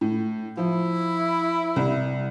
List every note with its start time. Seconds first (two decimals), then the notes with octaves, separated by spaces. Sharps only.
0.01 A2
0.57 F3 E4
1.76 C2